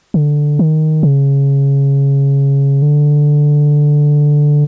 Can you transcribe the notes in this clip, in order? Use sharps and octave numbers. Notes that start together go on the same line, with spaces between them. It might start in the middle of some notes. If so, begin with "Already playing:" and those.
D3
D#3
C#3
D3